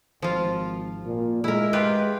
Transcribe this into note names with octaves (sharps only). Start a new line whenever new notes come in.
G#1 F3 F4
A#2
G#3 E4 A#4
F4 G4 B4